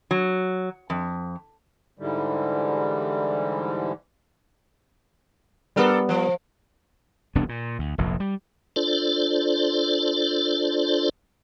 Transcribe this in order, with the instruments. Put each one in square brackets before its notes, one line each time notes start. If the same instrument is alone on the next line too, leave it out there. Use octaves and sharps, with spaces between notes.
[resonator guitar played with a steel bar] F#3
F2
[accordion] G#2 D3 E3 G3
[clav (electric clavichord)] G3 B3 [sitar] D4 A4 A#4
[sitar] F3
[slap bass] E1 C2 B3 D4
A#2
D2
F1 A#1 F2
G3
[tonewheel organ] D4 F4 A4 C5 D5